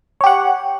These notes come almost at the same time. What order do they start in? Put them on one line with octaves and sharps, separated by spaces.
C#5 G4 F#5